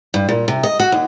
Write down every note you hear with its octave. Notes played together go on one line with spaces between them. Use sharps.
G2
A#2
C3
D#5
F#4
D#2